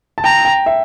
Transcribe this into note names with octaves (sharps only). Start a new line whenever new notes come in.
A5
G5 A#5
G5
E5